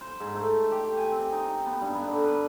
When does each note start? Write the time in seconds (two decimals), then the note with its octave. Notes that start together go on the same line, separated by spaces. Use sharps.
0.01 C5
0.20 G#2
0.35 A3
0.71 G4
0.97 G#5
1.12 C4
1.32 D#4
1.66 B3
1.81 G2
1.95 B3
2.07 D3
2.24 B4